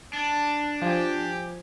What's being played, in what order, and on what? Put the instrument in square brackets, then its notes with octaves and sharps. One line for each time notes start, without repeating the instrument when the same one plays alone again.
[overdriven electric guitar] D4 [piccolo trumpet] A5
[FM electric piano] F3 G#5 [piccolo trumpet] G4